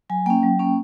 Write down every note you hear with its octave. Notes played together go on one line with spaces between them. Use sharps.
F#3 G#5
A#3 C#4 G5
F#3
A#3 C#4